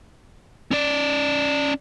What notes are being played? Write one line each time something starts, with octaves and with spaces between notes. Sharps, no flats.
C#4 D5